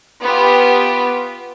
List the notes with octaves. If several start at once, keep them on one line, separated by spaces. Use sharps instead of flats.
B3 F4 G4